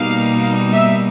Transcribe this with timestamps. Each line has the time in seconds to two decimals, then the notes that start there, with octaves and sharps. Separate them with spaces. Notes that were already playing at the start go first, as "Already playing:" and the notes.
Already playing: B2 G3 A#3 D#4 F5
0.72 E5